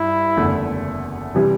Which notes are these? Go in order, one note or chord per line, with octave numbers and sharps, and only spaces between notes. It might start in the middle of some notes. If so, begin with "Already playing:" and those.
Already playing: G2 E4
F#1 E2 D3 A3
C3 E3 G3